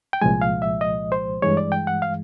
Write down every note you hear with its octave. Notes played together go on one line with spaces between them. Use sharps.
G5
C2 A#2 F3 G#3 G#5
F5
E5
D#5
C5
G2 E3 G#3 C#5
D5
G5
F#5
F5